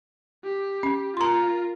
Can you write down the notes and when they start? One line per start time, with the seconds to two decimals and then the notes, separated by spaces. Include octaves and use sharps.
0.44 G4
0.83 C#4
1.17 F4 A#4 A#5 C6